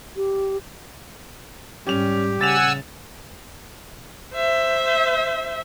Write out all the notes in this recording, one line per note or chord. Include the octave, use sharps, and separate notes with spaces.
G4
G#2 G3 C#4 G4 F7
C#3 F#5 G#5 E6 A6 E7 F7
C5 E5